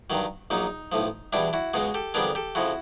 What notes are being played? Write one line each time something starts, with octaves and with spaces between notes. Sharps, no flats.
G2 D#3 F#3
A#1 A#2 F#3 D#4
B1 A2 F3
E2 B2 G3 D4 E4
E4 F#4
C#2 B2 G#3 F#4 G#4
G4 A4
F2 D3 G3 B3 D4 G#4 A#4
G4 A4
F2 C#3 F3 E4 F#4